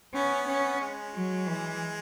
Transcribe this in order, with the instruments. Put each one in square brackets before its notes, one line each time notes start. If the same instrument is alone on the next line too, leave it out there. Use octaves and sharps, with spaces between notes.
[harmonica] B3 [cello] C#4
[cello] C#4
[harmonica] G#3
[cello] F#3
E3